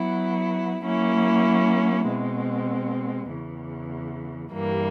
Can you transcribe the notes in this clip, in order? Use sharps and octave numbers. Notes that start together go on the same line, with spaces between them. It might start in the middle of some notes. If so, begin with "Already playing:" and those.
Already playing: F#3 B3 E4
F#3 A#3 C#4 E4
B2 G#3 C4
E2 C#3 E3
G2 E3 G3 A#3